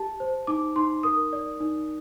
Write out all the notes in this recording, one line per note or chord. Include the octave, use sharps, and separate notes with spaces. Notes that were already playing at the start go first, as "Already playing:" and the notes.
Already playing: G4 A5
C5
D#4 D6
D#4 C6
A#4 D#6
D5
D#4